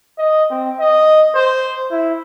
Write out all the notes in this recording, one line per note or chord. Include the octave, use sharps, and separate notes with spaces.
D#5
C4
D#5
C5
E4